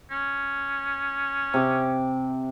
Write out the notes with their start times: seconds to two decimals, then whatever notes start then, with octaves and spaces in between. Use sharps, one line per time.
0.10 C#4
1.54 C3 D6